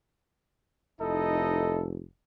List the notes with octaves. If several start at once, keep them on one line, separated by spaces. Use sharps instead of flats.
F1 D#4 E4 A4 D#5